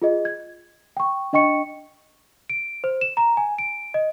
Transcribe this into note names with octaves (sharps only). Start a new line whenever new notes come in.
F4 G#4 D#5
G#6
G5 C#6
D4 D#5 G5 C#6 C#7
D7
C5
E7
A#5
G#5
D7
D#5